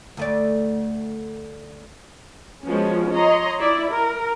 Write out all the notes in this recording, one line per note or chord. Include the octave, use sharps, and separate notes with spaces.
D2 A3 D5
F3 G#3 B3 C#4 F#4
C#5 D#5 A#5 C6
E4 D5
A#4